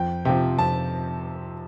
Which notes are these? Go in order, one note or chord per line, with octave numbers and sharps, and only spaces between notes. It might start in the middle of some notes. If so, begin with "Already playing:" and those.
Already playing: F2 G5
C3 F3 G5
F2 A5